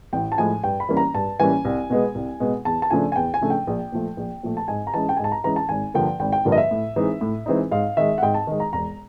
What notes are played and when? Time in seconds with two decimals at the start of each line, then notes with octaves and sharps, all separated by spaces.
0.13 A1 G5
0.32 A5
0.38 A2 F3 G#3 G#5
0.64 G2 G5
0.80 B5
0.89 E3 G3 A#3 C#4
0.97 A#5
1.14 G2 A5
1.39 E3 G3 A#3 C#4 G#5
1.65 C2
1.90 B2 G#3 B3
2.15 C2
2.40 B2 G#3 B3
2.65 E2 A5
2.82 A5
2.90 C#3 F3 A3 D4 G#5
3.12 G#5
3.16 E2 G5
3.34 G#5
3.41 C#3 F3 A3 D4
3.50 G5
3.67 A#1
3.92 A#2 F3 A3
4.17 A#1
4.43 A#2 F3 A3
4.57 A5
4.68 G#2 G#5
4.87 A#5
4.94 E3 G#3 C#4 A5
5.09 G5
5.17 G#2 G#5
5.24 A5
5.32 A#5
5.44 E3 G#3 C#4 A#5
5.56 A5
5.69 G#1 G#5
5.94 G2 D3 F3 A#3 G5
6.20 G#1 G5
6.33 G5
6.45 G2 D3 F3 A#3
6.52 D#5
6.58 E5
6.71 A2
6.96 E3 G#3 C4 D#4
7.21 A2
7.46 E3 G#3 C4 D#4
7.71 G#2 F5
7.97 D#3 G#3 E5
8.18 F#5
8.22 G#2 G5
8.34 A5
8.47 D#3 G#3
8.60 A#5
8.73 E1 A#5